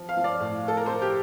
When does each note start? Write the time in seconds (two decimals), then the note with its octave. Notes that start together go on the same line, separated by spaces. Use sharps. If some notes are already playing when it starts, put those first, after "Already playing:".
Already playing: F3
0.09 F5
0.17 F3
0.24 D5
0.40 A2
0.62 A2
0.68 A4
0.77 A#4
0.86 F3 C5
1.02 G4